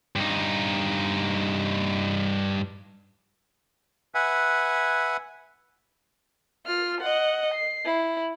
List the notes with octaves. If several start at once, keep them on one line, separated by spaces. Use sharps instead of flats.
G2 D#4
B4 E5 F#5 G#5
F4 F6
D#5 F#5
C7
E4